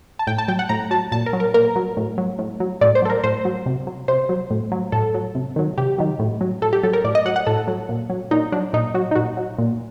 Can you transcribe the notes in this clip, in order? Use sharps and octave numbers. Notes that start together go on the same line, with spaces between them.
A5
A2 G5
A5
F#3 G5
F#5
A2 A#5
F#3 A5
A#2 A5
A#4
F#3
A#4
A#2 A#4
F#3
A2
F#3
A2
F#3
A2 D5
C5
F#3 A4
A#4
A2 C5
F#3
C3
F#3
C3 C5
F#3
A2
F#3
A2 A4
F#3
C3
D#3 F#3
C3 G4
D#3 F#3
A2
F#3
A2 A4
G4
F#3 A4
A#4
A2 D5
D#5
F#3 F#5
F#5
A2 A4
F#3
A#2
F#3
A#2 D#4
F#3 D4
A#2 D#4
F#3 F#4
D#4
A#2 F#4
F#3
A#2